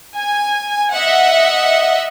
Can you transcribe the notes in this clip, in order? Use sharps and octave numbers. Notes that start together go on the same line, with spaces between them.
G#5
D#5 E5 F#5